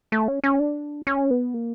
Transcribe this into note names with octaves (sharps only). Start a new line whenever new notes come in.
A3
C#4
C#4
D4
C#4
B3
A#3